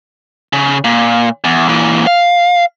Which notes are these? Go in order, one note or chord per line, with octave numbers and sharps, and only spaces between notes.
C#3
A#2
E2
A#2 E3
F5